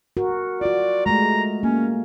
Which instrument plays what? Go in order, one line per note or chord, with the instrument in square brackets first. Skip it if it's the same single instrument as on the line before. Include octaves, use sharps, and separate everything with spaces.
[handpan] F#4 A#4
[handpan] F4 F#4 [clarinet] D5
[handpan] G#3 A3 [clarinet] A#5
[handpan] A#3 [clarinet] C#4